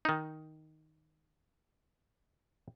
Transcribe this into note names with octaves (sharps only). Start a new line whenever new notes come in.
D#3 D#4